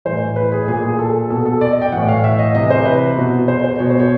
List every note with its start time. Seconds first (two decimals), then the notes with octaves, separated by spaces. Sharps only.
0.05 A2 E3 C5
0.36 B4
0.52 G#4
0.68 A#2 G#4
0.83 G#4
0.99 A4
1.30 B2 A4
1.46 A4
1.61 D5
1.72 D#5
1.82 G5
1.92 A2 E3 F#5
2.08 F5
2.24 E5
2.39 D#5
2.55 C3 E3 D#5
2.70 C5
2.85 B4
3.17 B2
3.48 C5
3.64 C5
3.79 B2 C#5
3.90 C5
4.00 C#5